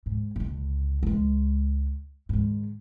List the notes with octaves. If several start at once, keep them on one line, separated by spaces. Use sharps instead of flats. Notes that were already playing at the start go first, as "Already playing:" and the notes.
G#2
C#2 D3
C#2 G#3
G#2 D#3